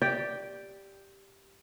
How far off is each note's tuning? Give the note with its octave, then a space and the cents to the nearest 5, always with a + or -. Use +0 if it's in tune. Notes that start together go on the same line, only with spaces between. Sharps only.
G4 +0 D5 +0 G5 +0